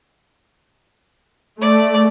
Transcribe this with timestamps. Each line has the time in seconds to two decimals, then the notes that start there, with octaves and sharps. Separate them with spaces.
1.62 A3 D5